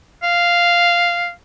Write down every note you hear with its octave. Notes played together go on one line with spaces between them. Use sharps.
F5